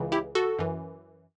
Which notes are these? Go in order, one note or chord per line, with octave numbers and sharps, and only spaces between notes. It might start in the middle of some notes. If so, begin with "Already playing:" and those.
Already playing: C#2 C#3 E3
E4 G4
F#4 A4
F#2 E3